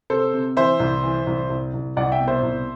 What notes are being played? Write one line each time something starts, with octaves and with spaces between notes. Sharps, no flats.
C3 A4 C5
C3
E3 C5 E5
C2
E3
C2
C2
C2
C2 D5 F#5
E5 G5
B2
C5 E5
C2